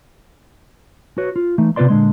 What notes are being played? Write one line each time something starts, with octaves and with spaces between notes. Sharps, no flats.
F#4 B4 C#5
F4
E3 A3 D#4
C3 B3 F4 B4 D5 C6
A#2 D3 G#3 C6